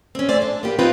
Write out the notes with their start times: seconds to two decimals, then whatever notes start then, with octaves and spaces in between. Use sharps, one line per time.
0.15 C4 C#4
0.29 A3 C5 D5 E5 G#5
0.42 D4
0.63 A#3 B3 G4
0.79 C4 D#4 F4 B4 G5